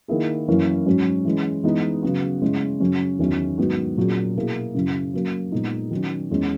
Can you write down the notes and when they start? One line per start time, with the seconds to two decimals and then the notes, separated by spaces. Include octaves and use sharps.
0.08 D#3 A#3 E4 G#4
0.47 F#2 E3 A#3 C#4 E4
0.86 G#2 F#3 C#4
1.25 E3 G#3 C#4
1.64 E3 G#3 B3 D#4
2.03 C#3 F#3 B3 F#4
2.42 C#3 G#3 C#4 E4
2.80 F#2 C#3 F#3 C#4
3.19 E2 D#3 F#3 C#4 E4
3.58 G#2 D#3 F#3 B3 F#4
3.98 A#2 F#3 C#4 G#4
4.36 B2 A#3 E4 G#4
4.75 F#2 C#3 F#3 C#4 E4
5.14 F#3 A#3 C#4
5.52 A#2 G#3 B3 D#4
5.91 D#3 F#3 C#4
6.31 E2 D#3 G#3 C#4